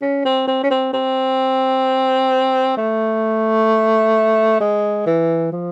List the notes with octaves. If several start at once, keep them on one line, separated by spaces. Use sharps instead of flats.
C#4
C4
C4
C#4
C4
C4
A3
G#3
E3
F3